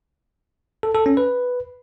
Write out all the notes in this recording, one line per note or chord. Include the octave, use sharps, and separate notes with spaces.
A4
A4
C#4
B4